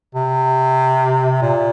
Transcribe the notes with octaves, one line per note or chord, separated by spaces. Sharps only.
C3
A#2